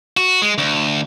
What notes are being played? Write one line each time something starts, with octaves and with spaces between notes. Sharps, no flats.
F#4
G#3
D2